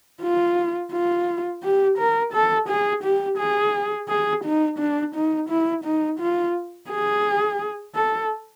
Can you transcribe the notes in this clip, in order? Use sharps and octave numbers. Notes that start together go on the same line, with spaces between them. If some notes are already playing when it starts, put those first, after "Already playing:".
F4
F4
G4
A#4
A4
G#4
G4
G#4
G#4
D#4
D4
D#4
E4
D#4
F4
G#4
A4